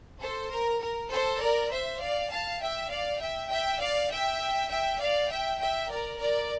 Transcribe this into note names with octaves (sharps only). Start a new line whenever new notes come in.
A4 C5
A#4
A#4
A4 C5
A#4 D5
C5 E5
D5 F5
F5 A5
E5 G5
D5 F5
E5 G5
E5 G5
D5 F5
E5 G5
E5 G5
D5 F5
E5 G5
E5 G5
A#4 D5
A#4 D5